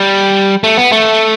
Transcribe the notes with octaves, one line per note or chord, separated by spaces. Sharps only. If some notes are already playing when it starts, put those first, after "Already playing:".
Already playing: G3
A3
B3
A3